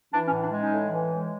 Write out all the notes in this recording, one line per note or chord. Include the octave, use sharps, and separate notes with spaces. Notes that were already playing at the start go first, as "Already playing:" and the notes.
E3 D4
C#4
A2
D4
G#3
C#4 D#4
A2
E3
G#3